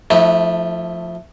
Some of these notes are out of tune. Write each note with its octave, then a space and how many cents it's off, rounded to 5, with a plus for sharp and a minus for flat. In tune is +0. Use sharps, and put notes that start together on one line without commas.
F3 +0 A3 +0 E4 -40